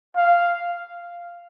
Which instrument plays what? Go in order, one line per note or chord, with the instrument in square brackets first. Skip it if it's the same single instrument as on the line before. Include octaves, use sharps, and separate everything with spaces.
[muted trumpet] F5